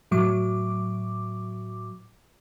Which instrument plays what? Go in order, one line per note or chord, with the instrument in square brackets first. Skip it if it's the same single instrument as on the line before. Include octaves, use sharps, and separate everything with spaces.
[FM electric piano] A2 F#3 D6